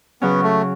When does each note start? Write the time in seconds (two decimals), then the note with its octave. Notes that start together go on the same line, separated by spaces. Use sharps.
0.22 C#3 F#3 B3 C#4
0.43 A3